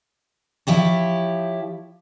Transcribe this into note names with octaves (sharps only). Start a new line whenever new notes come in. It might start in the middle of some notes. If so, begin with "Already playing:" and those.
F3 E4 G4 C#5